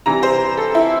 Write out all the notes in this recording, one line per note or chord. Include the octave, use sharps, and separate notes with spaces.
C3 E3 G3 A#5
C5
A4
E4